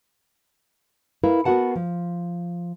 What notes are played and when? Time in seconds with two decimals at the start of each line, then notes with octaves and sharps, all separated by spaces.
1.24 E4 A#4 B4 F5
1.45 B3 F#4 A#4 F#5 A5
1.76 F3